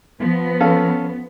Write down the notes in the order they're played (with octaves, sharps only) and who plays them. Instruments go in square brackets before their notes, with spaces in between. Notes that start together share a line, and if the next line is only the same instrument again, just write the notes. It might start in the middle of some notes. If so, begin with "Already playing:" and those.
[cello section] F3 B3
[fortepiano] C#4 A4 F5